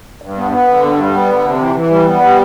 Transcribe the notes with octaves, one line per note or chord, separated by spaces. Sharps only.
G2
B3
B3
D3
G2
G3
B3
D3
C3
E3
E3
G3
B3
G3